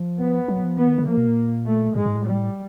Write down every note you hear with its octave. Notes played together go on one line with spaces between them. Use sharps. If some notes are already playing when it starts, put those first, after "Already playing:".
Already playing: F3
B3
F#3
F3
E3 B3
D#3
D3
F3 A#3
B2
A#2
A3
G#2 G#3
G#2
A2
G3